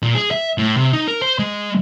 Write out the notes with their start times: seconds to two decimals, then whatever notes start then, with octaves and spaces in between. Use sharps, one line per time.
0.02 A#2
0.15 G#4
0.31 E5
0.58 A2
0.77 C3
0.93 D#4
1.08 A#4
1.22 C5
1.39 G#3